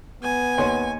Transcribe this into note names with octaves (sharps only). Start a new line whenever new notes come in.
B3 G#5
D#2 C#5 C6